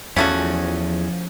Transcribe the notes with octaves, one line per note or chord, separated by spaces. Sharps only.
E2 C#3 F3 A3 C#4 F#4